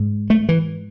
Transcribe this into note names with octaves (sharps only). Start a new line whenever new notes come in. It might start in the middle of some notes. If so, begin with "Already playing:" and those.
Already playing: G#2
A3
E3